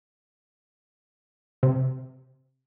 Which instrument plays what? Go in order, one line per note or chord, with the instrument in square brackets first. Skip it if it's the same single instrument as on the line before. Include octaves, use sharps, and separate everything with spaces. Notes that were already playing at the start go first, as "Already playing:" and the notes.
[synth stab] C3